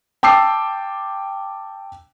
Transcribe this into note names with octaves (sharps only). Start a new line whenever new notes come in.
G5 A5 D6 E6 C7